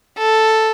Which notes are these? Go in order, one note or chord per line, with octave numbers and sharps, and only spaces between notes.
A4